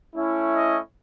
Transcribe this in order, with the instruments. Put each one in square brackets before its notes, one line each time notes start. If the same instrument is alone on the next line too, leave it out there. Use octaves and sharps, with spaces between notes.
[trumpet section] A3 C#4 E4
D#5